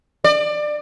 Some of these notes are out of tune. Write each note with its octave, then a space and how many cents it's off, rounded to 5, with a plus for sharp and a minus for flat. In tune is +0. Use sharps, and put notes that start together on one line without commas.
D5 +25